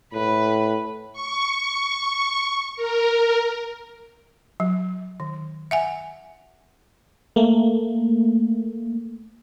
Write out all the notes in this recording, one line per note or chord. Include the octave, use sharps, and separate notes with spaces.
A2 B4
C#6
A#4
F#3
D#3
E5 F#5 G#5
A3 A#3